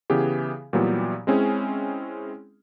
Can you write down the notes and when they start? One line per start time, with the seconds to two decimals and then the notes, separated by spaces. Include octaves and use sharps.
0.10 C#3 E3 B3 G4 G#4
0.73 A#2 E3 F#3 G3 B3
1.27 G#3 C4 C#4 E4 G#4